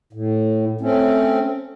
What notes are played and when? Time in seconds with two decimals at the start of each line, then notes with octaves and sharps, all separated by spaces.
0.13 A2
0.81 A3 C4 C#4